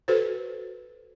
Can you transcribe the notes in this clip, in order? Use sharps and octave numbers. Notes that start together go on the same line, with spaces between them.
F#4 A4 B4 C5